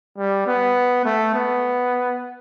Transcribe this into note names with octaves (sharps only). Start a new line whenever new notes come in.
G3
B3
A3
B3